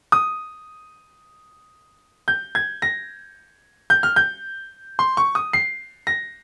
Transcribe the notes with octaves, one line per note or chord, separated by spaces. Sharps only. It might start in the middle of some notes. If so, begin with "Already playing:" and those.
D#6
G6
G#6
A#6
G6
F6
G6
C6
C#6
D#6
C7
A#6